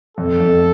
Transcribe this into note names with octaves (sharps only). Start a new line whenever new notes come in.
F2 A4
F2